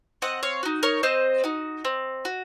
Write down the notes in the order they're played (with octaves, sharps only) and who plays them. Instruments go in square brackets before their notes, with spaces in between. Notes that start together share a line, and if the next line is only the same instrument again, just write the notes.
[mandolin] C4 D#5 F#5
C#5 F5
D#4 F#4
A#4 C#5
C4 C5 D#5
D#4 F#4
C4
F#4